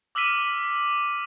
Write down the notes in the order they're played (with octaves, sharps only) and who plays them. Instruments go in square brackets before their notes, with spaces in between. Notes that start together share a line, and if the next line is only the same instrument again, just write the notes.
[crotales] D6 E6 F6 B6 D#7 F#7